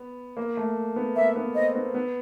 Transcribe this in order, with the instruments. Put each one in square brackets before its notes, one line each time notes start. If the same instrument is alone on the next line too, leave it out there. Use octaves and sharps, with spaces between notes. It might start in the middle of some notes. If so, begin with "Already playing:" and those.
Already playing: [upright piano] B3
A#3
A3
B3
[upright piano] A#3 [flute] E5
[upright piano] B3
[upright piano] C4 [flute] D#5
[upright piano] B3
B3